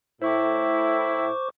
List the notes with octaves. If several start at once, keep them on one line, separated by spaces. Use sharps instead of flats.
A2 E4 C5 C#6 D6